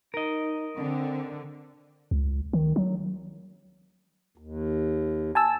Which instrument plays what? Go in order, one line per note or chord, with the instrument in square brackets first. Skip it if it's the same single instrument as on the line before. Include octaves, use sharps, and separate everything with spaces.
[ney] D#4 [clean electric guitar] A#4 D#5
[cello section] D3 [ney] C4
[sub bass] C#2
D#3
F#3
[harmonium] D#2
[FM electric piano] G#5 A5 E6